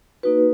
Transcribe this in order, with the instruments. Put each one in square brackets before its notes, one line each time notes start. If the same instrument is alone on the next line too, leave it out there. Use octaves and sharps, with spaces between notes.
[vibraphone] A#3 D#4 F#4 B4